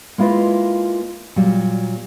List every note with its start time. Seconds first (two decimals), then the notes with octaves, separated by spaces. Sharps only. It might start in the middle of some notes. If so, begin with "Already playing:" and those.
0.18 G#3 A#3 E4 F4 B4 D#5
1.36 A#2 F#3 G3